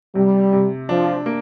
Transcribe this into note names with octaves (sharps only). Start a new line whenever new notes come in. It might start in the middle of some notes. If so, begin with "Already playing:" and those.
C3 G3
C3
F3 D4
A#3